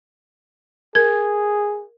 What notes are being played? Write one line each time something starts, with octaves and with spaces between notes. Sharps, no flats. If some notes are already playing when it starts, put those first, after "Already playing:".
G#4 A#4 G#6